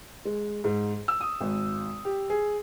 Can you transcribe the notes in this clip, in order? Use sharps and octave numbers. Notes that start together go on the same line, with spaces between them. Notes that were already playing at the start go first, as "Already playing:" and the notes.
G#3
G#2
E6
D#6
G#1
G4
G#4